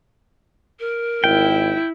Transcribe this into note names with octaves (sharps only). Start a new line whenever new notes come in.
A#4
G#1 E4 G5